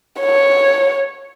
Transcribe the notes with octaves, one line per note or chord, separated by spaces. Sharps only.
C#5